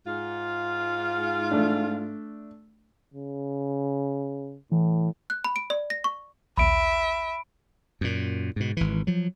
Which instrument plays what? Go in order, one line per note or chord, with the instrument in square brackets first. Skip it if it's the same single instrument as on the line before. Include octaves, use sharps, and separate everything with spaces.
[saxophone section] G#2 F4
[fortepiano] A3 D4
[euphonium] C#3
[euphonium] A2 [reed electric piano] E3
[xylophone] F#6
B5
D7
D5
A#6
C#6
[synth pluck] A#1 D#2 [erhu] E5 [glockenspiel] B5 D7
[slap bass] F#2 A#2
G#2 B2
G#1 E3
F3 F#3